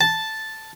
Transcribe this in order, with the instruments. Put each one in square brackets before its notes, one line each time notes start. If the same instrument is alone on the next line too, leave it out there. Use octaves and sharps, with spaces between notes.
[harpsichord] A5